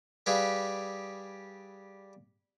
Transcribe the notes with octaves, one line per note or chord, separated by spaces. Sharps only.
G3 G4 G#4 B4 F5